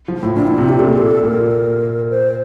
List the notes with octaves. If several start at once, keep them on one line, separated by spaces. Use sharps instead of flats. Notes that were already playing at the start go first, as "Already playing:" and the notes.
F3
A2
A#2 D4
E4
C3 F4
G4
A#2 A4
G4
A4
A#2 A#4
C5